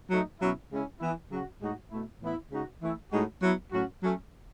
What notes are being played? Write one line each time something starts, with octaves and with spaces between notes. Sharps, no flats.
F#3 A3 D#4
B2 F#3 C#4 E4
C#3 G#3 C#4 E4
E3 B3 E4
C#3 F#3 C#4 F#4
A2 G#3 D#4 F#4
B2 A3 E4
A2 E3 B3 E4
C#3 G#3 D#4 F#4
E3 A3 E4
A2 G#3 D#4 F#4
F#3 B3 E4
A2 F#3 C#4 F#4
F#3 A3 C#4